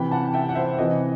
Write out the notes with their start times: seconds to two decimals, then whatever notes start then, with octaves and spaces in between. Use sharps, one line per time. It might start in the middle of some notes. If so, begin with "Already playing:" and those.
Already playing: C3 E3 G5 B5
0.11 F#5 A5
0.34 E5 G5
0.49 F#5
0.55 C5 E5
0.78 C3 E3 D#5 F#5